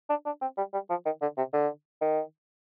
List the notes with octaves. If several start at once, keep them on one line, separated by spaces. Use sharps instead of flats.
D4
D4
C4
G3
G3
F3
D#3
D3
C3
D3
D#3